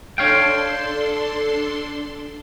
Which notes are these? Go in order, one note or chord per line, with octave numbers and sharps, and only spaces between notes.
D4 A4 C#5 F5 G5 C6